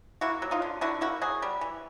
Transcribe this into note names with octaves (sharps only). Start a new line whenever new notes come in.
A#3 E4 F#4
F#3
D#4 F4
D3
D3 E4 F#4
A#3 E4 F#4
F#3 F#4 G#4
G3
E3